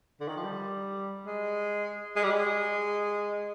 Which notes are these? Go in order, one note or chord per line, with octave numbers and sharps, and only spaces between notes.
D3
D#3
F3
G3
G#3
G#3
G3
G#3